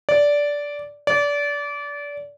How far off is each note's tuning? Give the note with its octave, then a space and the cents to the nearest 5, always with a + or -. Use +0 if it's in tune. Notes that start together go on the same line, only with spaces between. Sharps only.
D5 -10
D5 -25